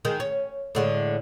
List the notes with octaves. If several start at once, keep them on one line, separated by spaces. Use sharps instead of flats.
D#3 G#3
C#4
A2 D3 G#3